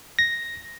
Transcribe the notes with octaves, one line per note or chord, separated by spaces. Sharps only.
A#6